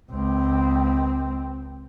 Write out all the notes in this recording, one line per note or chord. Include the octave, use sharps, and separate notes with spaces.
C#2 C4